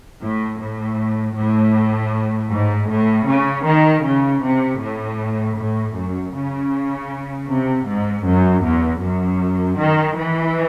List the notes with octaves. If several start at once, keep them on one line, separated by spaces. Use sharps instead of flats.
A2
A2
A2
G#2
A2
C#3
D#3
C#3
C3
A2
A2
F#2
C#3
C3
G#2
F#2
E2
F#2
D#3
E3